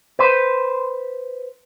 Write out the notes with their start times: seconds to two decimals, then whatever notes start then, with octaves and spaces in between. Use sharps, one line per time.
0.19 B4 C5